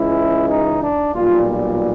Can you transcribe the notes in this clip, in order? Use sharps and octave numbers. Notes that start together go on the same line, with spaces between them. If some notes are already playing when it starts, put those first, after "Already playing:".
Already playing: C#2 C#3 E3 G#3 E4
D#4
D4
B1 A#2 G3 F4